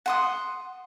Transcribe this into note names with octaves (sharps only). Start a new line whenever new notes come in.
F#5 C6 D#6